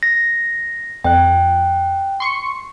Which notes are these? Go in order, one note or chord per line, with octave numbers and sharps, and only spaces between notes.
A#6
F2 G5 F#6
C6 C#6 C#7